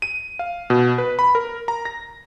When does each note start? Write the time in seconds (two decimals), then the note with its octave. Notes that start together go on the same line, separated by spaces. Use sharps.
0.02 D#7
0.39 F5
0.70 B2
0.98 B4
1.19 B5
1.35 A#4
1.68 A#5
1.85 A#6